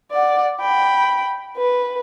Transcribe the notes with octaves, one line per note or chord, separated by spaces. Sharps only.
D5 F#5
G5 B5
B4